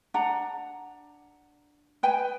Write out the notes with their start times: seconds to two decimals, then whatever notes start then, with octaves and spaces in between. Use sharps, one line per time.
0.14 D4 F#5 A#5
2.03 B4 G5 G#5